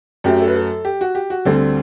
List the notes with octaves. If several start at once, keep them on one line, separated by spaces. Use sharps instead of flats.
F#2 F#3 A3 G4
A4
B4
A4
G4
F#4
G4
F#4
D2 D3 G3 C4 A4